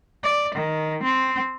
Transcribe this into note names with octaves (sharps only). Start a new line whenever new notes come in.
D5
D#3
C4